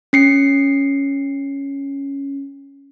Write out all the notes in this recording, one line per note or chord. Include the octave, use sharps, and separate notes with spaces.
C#4 C7 C#7